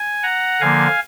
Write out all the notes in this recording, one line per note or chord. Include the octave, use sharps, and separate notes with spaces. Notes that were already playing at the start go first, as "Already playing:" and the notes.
Already playing: G#5
F#5 A#5
D3 F3 A#3 F5 G#5